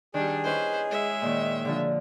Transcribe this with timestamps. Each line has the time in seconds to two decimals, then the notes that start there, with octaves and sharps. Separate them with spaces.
0.14 D#3 G3 D4 G#4 D5
0.44 C#4 E4 B4 C5 D#5
0.90 G#3 E5
1.22 A#2 D#3 D#5
1.65 D3 F3 G#4